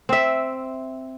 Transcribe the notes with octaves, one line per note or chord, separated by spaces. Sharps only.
C4 E5